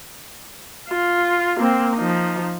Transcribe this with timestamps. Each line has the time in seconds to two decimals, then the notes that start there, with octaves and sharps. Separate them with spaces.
0.89 F4
1.58 A#3 C4
1.96 F3 D#4